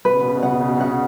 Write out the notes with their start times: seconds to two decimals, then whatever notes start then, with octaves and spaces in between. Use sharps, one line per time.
0.05 B2 B4
0.13 C#3
0.21 B2
0.28 C#3
0.37 B2
0.43 C#3 F#5
0.52 B2
0.60 C#3
0.68 B2
0.76 C#3
0.81 B2 F#5
0.92 C#3